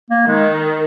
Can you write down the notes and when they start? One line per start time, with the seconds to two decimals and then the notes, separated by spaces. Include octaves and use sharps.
0.10 A#3
0.27 D#3 G#3